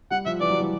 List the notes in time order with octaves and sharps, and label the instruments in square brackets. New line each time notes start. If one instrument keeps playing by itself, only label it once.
[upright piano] G3 [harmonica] F#5
[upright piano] F3 [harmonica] E5
[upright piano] E3 [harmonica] D5
[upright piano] F#3
G3